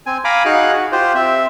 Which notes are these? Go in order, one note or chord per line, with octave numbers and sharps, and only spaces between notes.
C4 G#5
F5 G#5 A#5 B5 D6
D#4 F#4 G#4 F5 F#6
F#4
F4 G4 C5
C4 E5